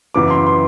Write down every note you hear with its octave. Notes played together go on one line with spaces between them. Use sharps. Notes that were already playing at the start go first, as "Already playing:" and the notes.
F#2 C#3 E3 D6
C6
C6